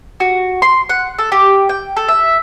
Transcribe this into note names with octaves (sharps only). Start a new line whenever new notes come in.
F#4
C6
F#5
A4
G4
G5
A4
E5